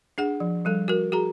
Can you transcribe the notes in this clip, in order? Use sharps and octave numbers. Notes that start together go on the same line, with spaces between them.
D4 G#4 F#5
F3
F3 G3 A4
F#4 A#4
F#4 G#4 A#5